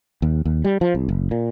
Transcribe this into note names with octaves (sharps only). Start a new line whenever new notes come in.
D#2
D#2
G3
F3
C2
F#1
A#2